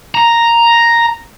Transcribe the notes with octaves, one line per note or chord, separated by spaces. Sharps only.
A#5